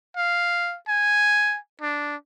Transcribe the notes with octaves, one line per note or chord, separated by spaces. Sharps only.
F5
G#5
D4